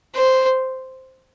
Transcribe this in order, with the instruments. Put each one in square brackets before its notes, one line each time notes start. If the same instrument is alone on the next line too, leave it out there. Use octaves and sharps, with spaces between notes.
[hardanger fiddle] C5